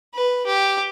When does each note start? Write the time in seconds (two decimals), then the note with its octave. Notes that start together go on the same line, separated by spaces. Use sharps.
0.14 B4
0.46 G4